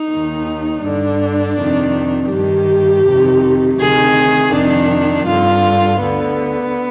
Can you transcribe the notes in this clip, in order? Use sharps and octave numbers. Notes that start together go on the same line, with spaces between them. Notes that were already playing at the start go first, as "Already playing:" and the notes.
Already playing: D#4
D#2 D#3
G2 D3 D4
F2 C3 D#3
G2 D#3 G4
F2 C3 D#3
D2 C3 D#3 G#4
F2 C3 D#3 D4
G2 D3 F4
D2 D3 B3